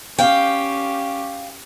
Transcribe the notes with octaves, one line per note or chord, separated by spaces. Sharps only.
C#4 G4 F5 G5